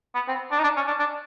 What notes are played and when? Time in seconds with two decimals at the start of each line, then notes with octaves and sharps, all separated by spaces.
0.15 B3
0.28 C4
0.52 D4
0.59 D#4
0.64 D4
0.77 C#4
0.87 D4
1.00 D4